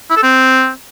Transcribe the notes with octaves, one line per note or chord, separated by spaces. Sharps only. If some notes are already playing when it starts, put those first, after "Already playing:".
E4
A4
C4